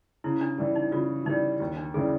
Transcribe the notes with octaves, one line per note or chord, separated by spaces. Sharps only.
C#3 E4
D4
E3 G3
D#4
C#3 F4
E3 G3 D#4
D#2
D4
C#3 E3 G3 G#4